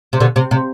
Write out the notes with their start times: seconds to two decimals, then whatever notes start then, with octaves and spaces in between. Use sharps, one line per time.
0.13 C3
0.20 B2 D3
0.36 C3
0.51 C3